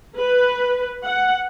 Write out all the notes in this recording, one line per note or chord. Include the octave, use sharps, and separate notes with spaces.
B4
F#5